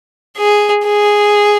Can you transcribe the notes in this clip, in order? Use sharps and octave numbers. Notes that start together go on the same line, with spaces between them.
G#4
G#4